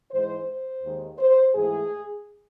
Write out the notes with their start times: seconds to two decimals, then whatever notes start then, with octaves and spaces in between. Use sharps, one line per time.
0.12 G#2 E3 G#3 C5
0.47 C5
0.83 D#2 D#3 G#3
1.19 C5
1.55 G#2 E3 A3 G#4